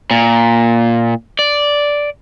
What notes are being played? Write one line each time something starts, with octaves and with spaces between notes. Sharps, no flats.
A#2
D5